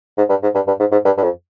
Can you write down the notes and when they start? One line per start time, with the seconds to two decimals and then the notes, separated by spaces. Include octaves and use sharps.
0.18 G#2
0.29 G2
0.43 G#2
0.55 G2
0.67 G2
0.80 G#2
0.92 G#2
1.05 G2
1.17 G2
1.23 F2